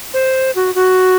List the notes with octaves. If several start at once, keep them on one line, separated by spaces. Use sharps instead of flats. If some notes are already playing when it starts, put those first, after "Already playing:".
C5
F#4
F#4